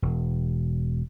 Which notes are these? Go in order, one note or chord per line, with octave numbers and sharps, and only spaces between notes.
E1